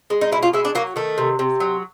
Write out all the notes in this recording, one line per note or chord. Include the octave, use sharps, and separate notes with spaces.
G#3
D#4
B2 E4
F4
G#3 E4
D4
F#3 A#3
D#3 A3
C3
C3
F#3